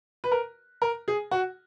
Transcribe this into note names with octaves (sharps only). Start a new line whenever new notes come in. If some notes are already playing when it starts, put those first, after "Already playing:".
B4
A#4
A#4
G#4
F#4